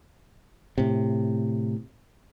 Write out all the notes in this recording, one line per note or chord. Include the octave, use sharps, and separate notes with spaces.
A2 C3